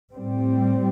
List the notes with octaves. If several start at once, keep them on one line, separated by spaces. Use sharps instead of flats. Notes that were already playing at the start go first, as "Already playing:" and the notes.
A2 G3 C4